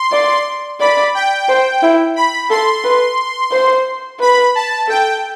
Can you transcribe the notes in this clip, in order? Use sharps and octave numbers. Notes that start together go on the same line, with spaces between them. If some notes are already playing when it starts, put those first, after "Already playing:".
Already playing: C6
D5
D5 B5
G5
C5
E4
B5
A4 C6
B4
C5
B4 B5
A5
A4 G5